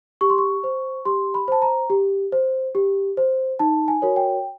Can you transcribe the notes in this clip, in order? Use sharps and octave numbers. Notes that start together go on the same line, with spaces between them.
G4 C#6
C6
C#6
C5
G4 C6
B5
C5 A5
A#5
G4
C5
G4
C5
D#4 A5
G#5
F#4 A#4 C#5
G5